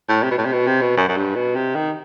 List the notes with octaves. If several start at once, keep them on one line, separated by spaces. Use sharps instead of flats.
A2
C3
B2
A2
C3
B2
C3
B2
F#2
F#2
G2
B2
C3
D#3